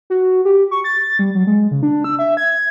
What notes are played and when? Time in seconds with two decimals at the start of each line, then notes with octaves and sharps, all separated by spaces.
0.10 F#4
0.45 G4
0.71 C#6
0.84 A6
1.19 G3
1.35 F#3
1.47 G#3
1.71 C#3
1.83 D4
2.04 E6
2.19 E5
2.37 G#6